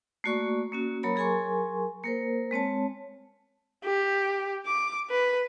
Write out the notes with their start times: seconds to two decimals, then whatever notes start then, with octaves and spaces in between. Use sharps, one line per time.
0.24 A3 A#3 F#4 D5 C#6
0.72 A#3 C#4 F#4
1.03 F#3 A#3 A#4 C#5 A#5 B5
1.16 F#3 G#4 A#4 G#5 C6 C#6
2.03 A#3 A#4 C5
2.51 G#3 C4 C#5 A5
3.84 G4
4.66 D6
5.10 B4